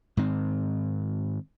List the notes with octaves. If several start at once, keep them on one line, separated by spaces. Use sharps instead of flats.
G#2 D#3 C4